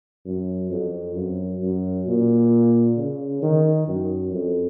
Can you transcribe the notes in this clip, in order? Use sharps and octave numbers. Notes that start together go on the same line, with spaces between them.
F#2
F2
F#2
F#2
A#2
C#3
D#3
F#2
F2